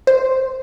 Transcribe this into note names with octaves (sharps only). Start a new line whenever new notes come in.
C5